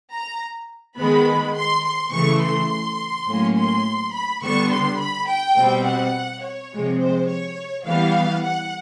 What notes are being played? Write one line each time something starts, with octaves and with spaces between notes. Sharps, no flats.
A#5
D#3 G#3 B3 B5
C6
C6
C#3 E3 A3 C#6
C6
A2 F#3 A#3 C#4
C6
B5
D3 G3 B3 C#6
C6
B5
G5
B2 G3 C4
F#5
C#5
C3 F3 G#3
C5
C#5
E3 G3 B3 F5
F#5